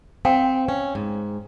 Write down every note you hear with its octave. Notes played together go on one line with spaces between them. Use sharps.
C4 F5 G5
C#4
G#2